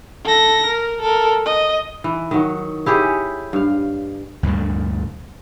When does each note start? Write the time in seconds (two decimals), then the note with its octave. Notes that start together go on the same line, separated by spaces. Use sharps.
0.25 A4 A#6
0.66 A#4
1.02 A4 A#4
1.46 D#5
2.04 E3
2.31 D#3 F#3
2.86 E4 G4 G#4 C#5
3.53 G2 F5
4.43 D2 G2 A#2 D3